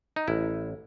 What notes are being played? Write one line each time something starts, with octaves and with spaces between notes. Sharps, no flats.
D#4
A1 E4